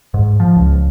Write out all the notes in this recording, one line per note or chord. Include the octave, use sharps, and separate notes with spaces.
G#2
F3
C#2